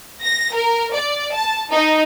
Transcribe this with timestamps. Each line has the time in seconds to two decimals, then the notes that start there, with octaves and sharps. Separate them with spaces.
0.24 A#6
0.54 A#4
0.95 D5
1.33 A5
1.72 D#4